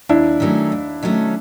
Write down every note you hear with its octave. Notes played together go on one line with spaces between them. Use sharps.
D#2 D4 E4
D#3 F#3 A3 C#4
D#2
D#3 F#3 A3 C#4